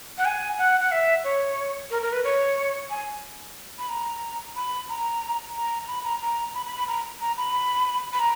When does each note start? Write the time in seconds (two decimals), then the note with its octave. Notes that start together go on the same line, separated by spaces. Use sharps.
0.18 F#5
0.25 G#5
0.58 F#5
0.80 F#5
0.92 E5
1.24 C#5
1.91 A#4
2.02 A#4
2.12 B4
2.24 C#5
2.90 G#5
3.79 B5
3.89 A#5
4.56 B5
4.89 A#5
5.55 A#5
5.88 B5
6.05 A#5
6.22 A#5
6.55 B5
6.66 B5
6.76 B5
6.88 A#5
7.21 A#5
7.37 B5
8.13 B5
8.19 A#5